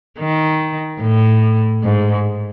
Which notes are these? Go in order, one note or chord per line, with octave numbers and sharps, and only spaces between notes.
D#3
A2
G#2